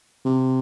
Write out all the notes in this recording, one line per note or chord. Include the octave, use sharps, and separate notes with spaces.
C3